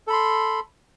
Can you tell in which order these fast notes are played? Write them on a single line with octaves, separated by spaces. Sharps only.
A4 B5 C6